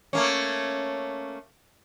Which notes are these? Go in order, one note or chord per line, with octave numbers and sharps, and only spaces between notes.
A3 A#3 C#4